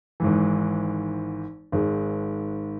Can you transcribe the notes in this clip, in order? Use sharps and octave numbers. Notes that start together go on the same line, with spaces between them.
G#1 G#2 E3
G#1 G#2 G#3